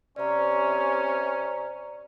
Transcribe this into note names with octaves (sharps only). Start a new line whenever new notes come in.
C3 C#4 D5 A#5